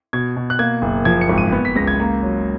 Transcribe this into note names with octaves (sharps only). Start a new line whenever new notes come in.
B2 G#6
B2
F#6
A#3 G#6
F#1
F3 G#6
C#7
G#1
D#7
B3
B6
C#2 A#6
G#6
A#3 A#5
F#3